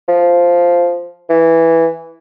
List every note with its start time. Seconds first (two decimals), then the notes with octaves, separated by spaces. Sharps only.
0.08 F3
1.30 E3